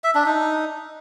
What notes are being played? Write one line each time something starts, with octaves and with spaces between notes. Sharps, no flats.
E5
D4
D#4